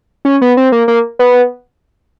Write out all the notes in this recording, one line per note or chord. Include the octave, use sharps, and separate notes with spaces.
C#4
B3
C4
A#3
A#3
B3